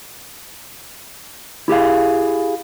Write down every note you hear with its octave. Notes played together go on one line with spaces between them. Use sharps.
E4 G4 G#4 F5